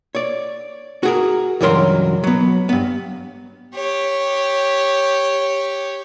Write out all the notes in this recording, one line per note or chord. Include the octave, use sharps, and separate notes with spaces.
C#5 D5
F#4 G#4 A#4
C#2 G2 E3 F#3 A#4 C6
F#3 B3
G2 B3
G4 C#5